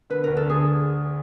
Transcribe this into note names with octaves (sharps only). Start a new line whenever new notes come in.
D3 B4
D2 A#4
A4
D3 G#4